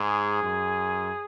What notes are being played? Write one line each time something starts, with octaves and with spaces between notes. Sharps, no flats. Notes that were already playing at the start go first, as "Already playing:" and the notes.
Already playing: G#2 G#4
F#2